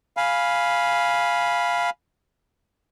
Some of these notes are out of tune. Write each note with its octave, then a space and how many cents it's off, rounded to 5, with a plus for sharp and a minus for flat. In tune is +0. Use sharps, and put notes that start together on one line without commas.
F5 +0 G#5 +0 B5 -10